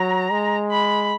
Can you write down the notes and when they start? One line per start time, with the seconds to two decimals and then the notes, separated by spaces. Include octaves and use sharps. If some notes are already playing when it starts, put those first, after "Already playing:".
Already playing: F#3 A#5
0.31 G#3
0.71 B5